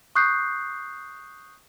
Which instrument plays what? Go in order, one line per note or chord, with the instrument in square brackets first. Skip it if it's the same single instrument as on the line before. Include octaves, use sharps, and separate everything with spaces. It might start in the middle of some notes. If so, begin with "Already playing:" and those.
[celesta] C#6 D#6 F#6 G6 C7